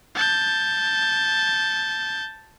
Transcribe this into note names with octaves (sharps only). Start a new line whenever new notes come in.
A5 G6